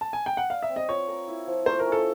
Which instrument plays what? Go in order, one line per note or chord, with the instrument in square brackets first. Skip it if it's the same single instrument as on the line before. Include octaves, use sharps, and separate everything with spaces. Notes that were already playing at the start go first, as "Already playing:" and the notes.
[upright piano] A5
G#5
G5
F#5
[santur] D5 [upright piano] F5
[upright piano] E5
[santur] C4
[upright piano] D#5
[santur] F4 [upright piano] C#5
[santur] A#4
E4
F3
[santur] A3 [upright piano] C5
[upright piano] A#4
[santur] C#4
[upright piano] A4